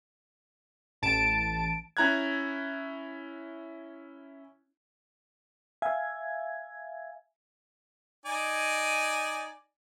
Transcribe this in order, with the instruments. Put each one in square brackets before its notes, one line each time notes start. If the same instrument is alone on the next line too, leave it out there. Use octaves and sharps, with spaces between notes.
[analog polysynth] A1 A5 D7
[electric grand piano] C#4 E4 A#5 F#6 G#6
[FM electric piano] E5 F5 G#5 G#6
[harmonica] D#4 D5 G#5